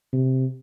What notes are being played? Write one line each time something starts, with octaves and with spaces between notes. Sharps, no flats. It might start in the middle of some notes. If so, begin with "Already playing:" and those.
C3